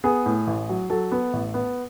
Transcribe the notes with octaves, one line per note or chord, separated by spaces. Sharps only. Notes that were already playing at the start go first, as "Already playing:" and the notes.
B3 G#4
A2
A1
F#3
F#3 A4
B3
A1
B3